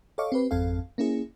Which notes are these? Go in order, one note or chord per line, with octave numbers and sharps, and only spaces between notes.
A4 C#5 D#5 F5 C#6 D6
C4 G4 B4
G#1 F2 C4 A4 F5
A#3 C#4 E4 G#4